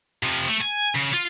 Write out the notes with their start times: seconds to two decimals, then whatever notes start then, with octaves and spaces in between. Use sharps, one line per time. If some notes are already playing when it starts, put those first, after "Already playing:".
0.23 C3 F3
0.48 A3
0.62 G#5
0.96 C#3
1.13 F4